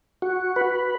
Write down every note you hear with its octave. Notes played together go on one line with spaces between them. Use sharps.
F#4
B4